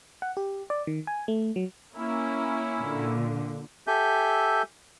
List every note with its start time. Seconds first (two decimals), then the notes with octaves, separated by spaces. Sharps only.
0.22 F#5
0.37 G4
0.70 D5
0.87 D#3
1.07 G#5
1.28 A3
1.56 F#3
1.95 A#3 C#4 E4
2.79 A#2 D3
3.87 G4 A4 E5 G#5 G6